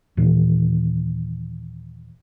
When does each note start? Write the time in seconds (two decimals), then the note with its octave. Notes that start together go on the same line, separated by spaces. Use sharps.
0.17 D#2 A#2 E3